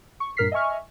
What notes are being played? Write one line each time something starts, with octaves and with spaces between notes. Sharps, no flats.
C#6
G2 A#2 A#4 F6 B6 C7
D#5 E5 G#5 C#6 F6